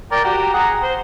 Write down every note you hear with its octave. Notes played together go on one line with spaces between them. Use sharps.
A#4 D5 G5
F#4 G4 A#5
G#4 F#5 A#5
C5